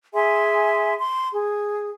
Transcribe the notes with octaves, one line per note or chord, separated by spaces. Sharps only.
G#4 E5 G#5 C6
C6
G#4